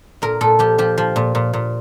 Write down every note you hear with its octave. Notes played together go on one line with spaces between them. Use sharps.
A#2 A#4
A#2 A4
F3 G4
F3 G4
F3
A#2
A#2
A#2